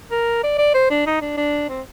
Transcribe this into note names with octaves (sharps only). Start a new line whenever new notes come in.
A#4
D5
D5
C5
D4
D#4
D4
D4
C4